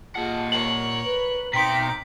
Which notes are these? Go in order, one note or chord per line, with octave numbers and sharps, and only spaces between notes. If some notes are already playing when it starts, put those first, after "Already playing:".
A#2 F4 G#4 D#5 F#5 A5
A#4 C#5 F#7
B4
B2 C4 D#4 G5 A#5 C6 D6 B6